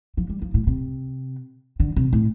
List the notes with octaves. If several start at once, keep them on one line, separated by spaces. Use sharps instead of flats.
F3
G3
F3
A2
C3
D3
C3
A2